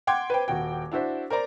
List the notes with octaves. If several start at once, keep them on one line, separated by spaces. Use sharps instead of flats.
F#5 G5 C6 D6 G#6
B4 C5 G5
D#1 F#4 G5
D4 E4 F#4 C5 E5
A#4 C5 D5 A#5